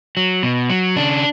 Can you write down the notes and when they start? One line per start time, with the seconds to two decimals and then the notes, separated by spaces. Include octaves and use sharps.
0.17 F#3
0.43 B2
0.70 F#3
0.96 C#3 D4